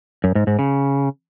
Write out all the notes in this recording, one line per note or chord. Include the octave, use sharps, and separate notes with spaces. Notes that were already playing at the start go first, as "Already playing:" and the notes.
F#2
G#2
G#2
C#3